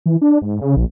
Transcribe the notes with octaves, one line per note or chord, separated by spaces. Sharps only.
E3
D4
G#2
C#3
A#1